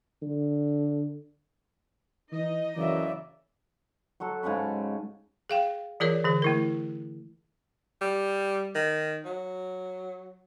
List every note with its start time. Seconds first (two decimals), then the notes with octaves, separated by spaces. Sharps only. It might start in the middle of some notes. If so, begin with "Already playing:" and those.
0.22 D3
2.32 E3 D#4 D#5
2.76 F#2 C#3 E3 D5 E5
4.20 F#3 F#4 A4
4.43 G#2 C#3 A5 B5
5.50 G#4 F5 G5
6.00 E3 F4 G#4 A#4 C#5 D5
6.24 D3 E3 G#4
6.42 A3 E4 A#4
8.02 G3
8.75 D#3
9.25 F#3